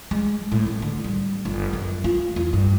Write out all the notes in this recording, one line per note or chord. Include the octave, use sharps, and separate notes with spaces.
G#3
A2
B3
D3
G3
G1
F#2
F4
E2
G2